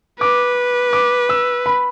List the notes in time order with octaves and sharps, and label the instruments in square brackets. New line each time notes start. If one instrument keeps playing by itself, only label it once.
[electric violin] B4 [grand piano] D6
[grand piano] D6
E6
B5